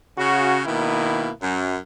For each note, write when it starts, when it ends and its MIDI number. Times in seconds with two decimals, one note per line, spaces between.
0.16 0.60 49
0.16 0.60 66
0.65 1.28 47
0.65 1.28 51
0.65 1.28 58
0.65 1.28 64
1.41 1.76 42